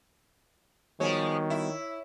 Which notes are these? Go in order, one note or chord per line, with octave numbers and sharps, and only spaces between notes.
D#3 F3 G3 G#3 B3 F#4 C#5
E4